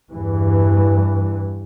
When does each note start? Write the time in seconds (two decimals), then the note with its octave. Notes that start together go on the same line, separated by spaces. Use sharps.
0.11 E2 G2 E3